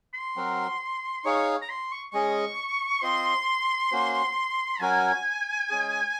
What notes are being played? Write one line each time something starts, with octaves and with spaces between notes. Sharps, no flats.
C6
F#3 C4 F#4 A#4
D#4 G#4 C#5 F5 C#6
A#5
C6
C#6
G#3 C#4 G#4 D#5 C#6
C4 F4 C5 D#5 C6
A#3 C#4 F#4 C5
F#3 C#4 F#4 A#4 G#5
G#3 C#4 G#4